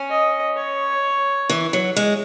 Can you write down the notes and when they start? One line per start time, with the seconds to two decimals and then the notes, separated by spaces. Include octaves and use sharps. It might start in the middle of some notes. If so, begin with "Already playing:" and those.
Already playing: C#4
0.10 D#5
0.56 C#5
1.50 E3
1.73 F#3
1.96 G#3